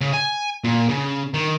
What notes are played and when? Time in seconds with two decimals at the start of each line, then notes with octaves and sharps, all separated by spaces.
0.01 C#3
0.14 G#5
0.64 A#2
0.89 C#3
1.34 D#3